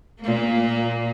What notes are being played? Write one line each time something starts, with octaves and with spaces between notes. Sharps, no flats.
A#2 A#3